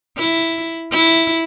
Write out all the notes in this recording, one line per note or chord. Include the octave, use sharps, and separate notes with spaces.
E4
E4